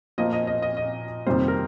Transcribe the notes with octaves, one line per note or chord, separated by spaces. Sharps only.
A#2 F3 A#3 D#5
D#5
D#5
D#5
D#5
F2 C3 D#3 G3 A#3 C5
A#4